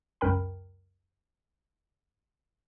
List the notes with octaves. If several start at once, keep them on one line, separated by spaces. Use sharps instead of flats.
C#2 F#2 A#4 G5 B5